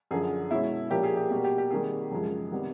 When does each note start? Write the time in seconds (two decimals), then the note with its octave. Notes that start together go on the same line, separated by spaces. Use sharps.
0.11 F#2 D3 F3 G#4
0.51 B2 G#3 C#4 E4
0.90 A#2 F3 A#3 C#4 G4
1.03 G#4
1.17 G4
1.30 B2 G3 A#3 G4
1.44 G4
1.58 G4
1.71 C3 D#3 G3 A#3 G#4
2.11 F#2 C#3 F3 G#3
2.51 C3 D#3 G3 B3